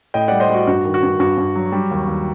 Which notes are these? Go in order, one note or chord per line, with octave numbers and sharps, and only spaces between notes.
A2 D#5 G5
G3 D5 F#5
C5 D#5
G3 F#4
G2 F#4
D#3
F#4
G2
G2 F#4
G2
F#3
G3
D#2
D#2